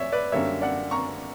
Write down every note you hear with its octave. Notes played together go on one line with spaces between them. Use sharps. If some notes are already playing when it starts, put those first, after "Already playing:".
Already playing: E2 C#5 D5 E5
B4 D5
F#2 D3 G3 A#3 C#5 E5
D5 F#5
A#5 C#6